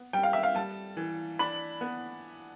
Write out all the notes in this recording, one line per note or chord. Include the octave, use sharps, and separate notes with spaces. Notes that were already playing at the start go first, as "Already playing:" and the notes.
Already playing: B3
G3 G5
F5
E5
F5
G3 A5
E3
D4 B5
B3